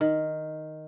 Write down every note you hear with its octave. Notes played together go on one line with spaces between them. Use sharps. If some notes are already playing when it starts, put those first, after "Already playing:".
D#3